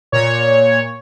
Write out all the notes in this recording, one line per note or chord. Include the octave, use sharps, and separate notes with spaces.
A#2 C#5